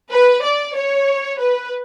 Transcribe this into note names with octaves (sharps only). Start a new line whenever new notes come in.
B4
D5
C#5
B4